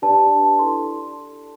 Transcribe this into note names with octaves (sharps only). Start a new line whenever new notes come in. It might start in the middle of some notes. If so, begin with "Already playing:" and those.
D4 G4 B4 D5 A5
E4 A4 D5 C6